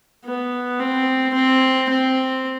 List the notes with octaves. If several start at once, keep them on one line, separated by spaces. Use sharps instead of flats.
B3
C4
C4
C4